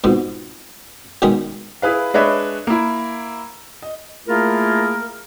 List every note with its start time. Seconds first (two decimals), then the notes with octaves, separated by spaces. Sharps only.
0.04 F2 G#2 B2
1.22 B2 D#3 G#3 C#4 D#4
1.82 E4 G#4 B4 F5
2.14 G#3 D4 B4 C#5 D#5 E5
2.67 A#3 E4
3.82 D#5
4.27 A3 A#3 E4 F4 G#4 A#4